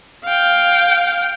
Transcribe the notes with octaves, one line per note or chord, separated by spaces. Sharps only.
F5 G5